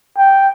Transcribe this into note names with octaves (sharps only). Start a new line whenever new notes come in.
G5